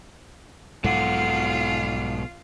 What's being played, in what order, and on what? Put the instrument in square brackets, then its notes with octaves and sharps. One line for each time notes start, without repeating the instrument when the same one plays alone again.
[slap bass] B1 G#2 F#3 [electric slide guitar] B2 A4 F#5 [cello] F4 F5